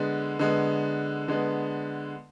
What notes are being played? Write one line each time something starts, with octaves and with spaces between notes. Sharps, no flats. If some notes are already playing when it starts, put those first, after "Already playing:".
Already playing: D3 G#3 B3
D3 G#3 B3
D3 G#3 B3